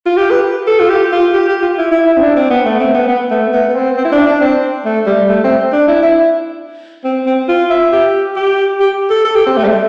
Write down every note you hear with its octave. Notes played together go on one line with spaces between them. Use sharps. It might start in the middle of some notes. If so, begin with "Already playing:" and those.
F4
G4
B4
A4
F4
G4
F4
G4
G4
F4
E4
E4
E4
C4
D4
C4
B3
A3
C4
B3
B3
A3
B3
B3
C4
C4
E4
D4
D4
C4
A3
G3
A3
C4
D4
E4
E4
C4
C4
F4
E5
G4
G4
G4
A4
A4
G4
C4
A3
G3
A3